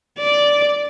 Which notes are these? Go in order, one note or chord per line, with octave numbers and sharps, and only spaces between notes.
D5